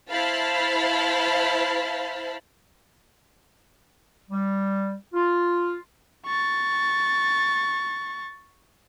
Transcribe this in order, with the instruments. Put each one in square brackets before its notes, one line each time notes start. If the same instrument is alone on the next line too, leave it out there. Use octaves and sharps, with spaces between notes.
[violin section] E4 C5 F5 A5 B5
[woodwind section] G3
F4
[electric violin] C#6 A6